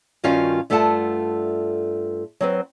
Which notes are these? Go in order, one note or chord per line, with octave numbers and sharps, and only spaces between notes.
G2 D#3 C#4 F4 F#4 F5
G2 A3 F4 A4 F#5 A5
F#3 C4 B4